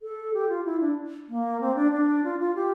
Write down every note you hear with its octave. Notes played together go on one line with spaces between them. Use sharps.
A4
G4
F4
E4
D4
A#3
C4
D4
D4
F4
F4
G4